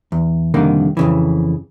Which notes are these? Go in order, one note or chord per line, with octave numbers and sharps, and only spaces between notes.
E2
C2 F2 D3 D#3 A#3
F2 C#3 E3